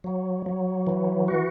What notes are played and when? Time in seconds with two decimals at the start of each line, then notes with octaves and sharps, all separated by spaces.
0.04 F#3
0.46 F#3
0.87 E3
1.28 F#4